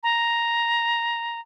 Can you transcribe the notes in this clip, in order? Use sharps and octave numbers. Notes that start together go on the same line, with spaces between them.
A#5